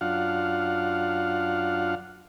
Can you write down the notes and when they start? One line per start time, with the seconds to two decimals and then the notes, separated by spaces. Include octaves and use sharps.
0.01 F#2 D4 F4 F5 F#5